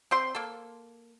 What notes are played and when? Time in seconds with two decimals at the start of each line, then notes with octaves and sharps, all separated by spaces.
0.11 C4 C5 C6
0.35 A#3 A4